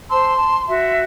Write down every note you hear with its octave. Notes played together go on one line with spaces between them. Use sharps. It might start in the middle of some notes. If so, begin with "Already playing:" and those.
C5 A5 C6 E6
A5
F#4 E5